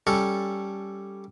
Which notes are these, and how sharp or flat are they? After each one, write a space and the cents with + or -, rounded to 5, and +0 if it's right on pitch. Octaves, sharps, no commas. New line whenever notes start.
G3 +0 C#4 +0 A4 +0